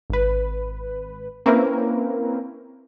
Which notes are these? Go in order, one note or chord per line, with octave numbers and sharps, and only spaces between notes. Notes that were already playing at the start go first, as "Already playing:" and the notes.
G#1 B4
A#3 C4 C#4 E4 A#4 B4